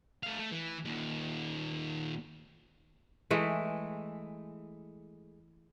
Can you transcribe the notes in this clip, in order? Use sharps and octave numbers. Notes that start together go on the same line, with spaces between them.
A3 F5
A3
E3
D#2 A#2
E3 G#3 A3